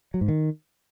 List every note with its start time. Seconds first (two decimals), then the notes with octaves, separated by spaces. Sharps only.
0.14 F#3
0.21 G#2
0.28 D#3